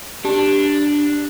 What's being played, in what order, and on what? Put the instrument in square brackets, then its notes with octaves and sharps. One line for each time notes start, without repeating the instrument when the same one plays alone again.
[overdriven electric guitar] D4 [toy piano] G4